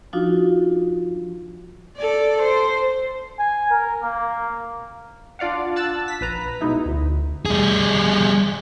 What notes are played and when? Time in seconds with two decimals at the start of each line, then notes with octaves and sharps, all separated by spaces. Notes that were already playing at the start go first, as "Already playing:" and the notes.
0.13 F3 D4 D#4 F4 F#4
1.97 A4 D5
2.42 C5
3.39 G#5
3.71 A#4
4.03 A#3
5.39 D4 F4 D5 F5 F#5
5.76 A5 E6 F#6 A6
6.08 B6
6.21 A#1 B4 A#5
6.61 B2 G#3 D#4 E4
6.86 D2
7.46 G3 G#4